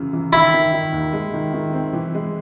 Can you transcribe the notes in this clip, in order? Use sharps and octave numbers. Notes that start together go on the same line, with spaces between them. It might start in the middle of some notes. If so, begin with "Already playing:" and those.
Already playing: F#2 C#3 E3
E3
D#3 E4
D#3
D#3
D#2
G#3
D#3
D#3
C4
E3
G#3